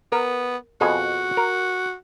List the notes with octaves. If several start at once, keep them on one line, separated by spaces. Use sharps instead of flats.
B3 A#4
F2 B2 F#4 G#4
A#4